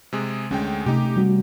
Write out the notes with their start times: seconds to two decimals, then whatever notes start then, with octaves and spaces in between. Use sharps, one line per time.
0.13 C3 G#3 G#4
0.51 D2 G#3 C#4 G5
0.86 C3 A3 D#4 G4
1.17 G3 C4 F#4